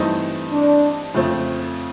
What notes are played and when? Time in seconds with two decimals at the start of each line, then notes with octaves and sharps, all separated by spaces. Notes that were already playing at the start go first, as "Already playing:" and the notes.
Already playing: G2 E3 A3 C4 D#4
0.52 D4
1.14 F2 C#3 F3 A3 C4